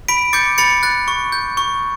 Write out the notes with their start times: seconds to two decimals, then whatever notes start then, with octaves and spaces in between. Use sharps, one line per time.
0.08 B5 B6 D7
0.33 D6 G6 A6 C#7
0.58 B5 A6 C#7
0.83 F#6 A6
1.08 C#6
1.32 G6
1.57 C#6